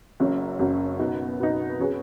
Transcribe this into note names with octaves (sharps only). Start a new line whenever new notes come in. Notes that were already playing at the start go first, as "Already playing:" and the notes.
F#1 F#2 F#3
F#1 F#2 F#3
B2 B3 D#4
B2 B3 D#4
F#3 C#4 G#4 B4